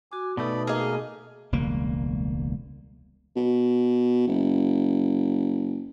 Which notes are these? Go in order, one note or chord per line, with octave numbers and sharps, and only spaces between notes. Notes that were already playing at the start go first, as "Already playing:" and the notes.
F#4 G#5 D6
B2 A3 D#4 B4 D5 B5
A#3 G#4 D#5 F6
E1 C#2 G3 A#3
B2
F#1